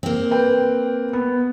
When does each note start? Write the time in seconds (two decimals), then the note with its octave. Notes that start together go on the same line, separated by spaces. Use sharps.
0.03 A#3 C4
0.31 B4 G5
1.13 B3